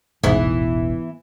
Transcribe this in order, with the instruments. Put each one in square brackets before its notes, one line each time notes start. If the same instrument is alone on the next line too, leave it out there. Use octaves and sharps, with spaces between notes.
[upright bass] E1 A1 [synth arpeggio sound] G#2 [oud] E3 B3